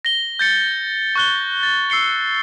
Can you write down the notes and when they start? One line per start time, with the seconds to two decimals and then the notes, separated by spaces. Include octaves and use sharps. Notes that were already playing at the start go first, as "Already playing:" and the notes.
0.05 A#6 G7
0.39 G6 A6 C#7
1.16 C#6 F#6 G7
1.63 A6
1.90 E6 C7 C#7 G7